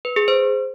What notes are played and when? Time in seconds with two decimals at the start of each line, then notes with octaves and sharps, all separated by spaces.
0.05 B4
0.16 G#4
0.28 C5